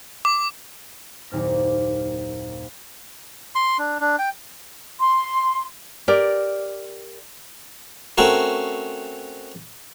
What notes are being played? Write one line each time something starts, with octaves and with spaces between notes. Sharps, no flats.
D6
F#1 D#2 A#2 C4 F6 A#6
C6
D4
D4
G5
C6
G4 A#4 D5
A3 C4 C#4 F#4 A#4